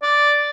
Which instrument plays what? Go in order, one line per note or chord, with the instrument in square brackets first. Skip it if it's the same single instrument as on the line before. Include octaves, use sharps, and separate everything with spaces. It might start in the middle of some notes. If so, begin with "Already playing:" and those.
[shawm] D5